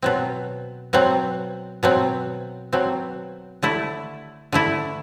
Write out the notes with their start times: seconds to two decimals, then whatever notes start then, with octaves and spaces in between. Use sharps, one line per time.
0.02 B2 F#3 C4
0.93 B2 F#3 C4
1.83 B2 F#3 C4
2.73 B2 F#3 C4
3.62 D3 A3 E4
4.52 D3 A3 E4